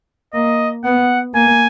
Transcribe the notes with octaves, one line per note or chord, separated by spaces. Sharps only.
A#3 D#5
B3 F#5
A#3 G#5